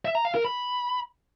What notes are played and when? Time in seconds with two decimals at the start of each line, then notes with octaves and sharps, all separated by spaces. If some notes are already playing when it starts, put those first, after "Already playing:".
0.05 E5
0.15 A#5
0.25 F5
0.35 A#4
0.45 B5